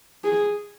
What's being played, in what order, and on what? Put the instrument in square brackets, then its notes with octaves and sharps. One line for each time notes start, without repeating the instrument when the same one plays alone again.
[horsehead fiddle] G#4